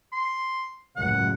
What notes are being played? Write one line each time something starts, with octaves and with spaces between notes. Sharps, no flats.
C6
C#2 F#2 A2 F#5